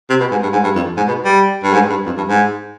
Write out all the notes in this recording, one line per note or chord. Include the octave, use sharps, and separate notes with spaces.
C3
B2
G#2
G2
G#2
G2
F2
G#2
B2
G3
G2
G#2
G2
F2
G2
G#2